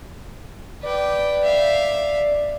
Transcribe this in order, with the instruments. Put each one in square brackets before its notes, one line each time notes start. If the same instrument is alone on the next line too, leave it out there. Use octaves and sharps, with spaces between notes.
[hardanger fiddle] B4 G5 [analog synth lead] D5
[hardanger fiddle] E5 F5